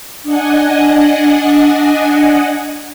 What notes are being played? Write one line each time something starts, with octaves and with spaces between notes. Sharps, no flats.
D4 D#5 F#5 G#5